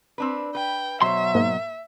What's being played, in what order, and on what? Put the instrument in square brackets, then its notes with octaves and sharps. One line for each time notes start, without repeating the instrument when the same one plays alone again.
[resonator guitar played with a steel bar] C4 D4 B4
[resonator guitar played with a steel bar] B4 [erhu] G5
[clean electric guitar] B2 F#3 C6 [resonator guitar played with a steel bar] C5 C#5 [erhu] E5
[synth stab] G#2 A#3